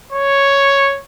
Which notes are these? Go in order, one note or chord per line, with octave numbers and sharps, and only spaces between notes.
C#5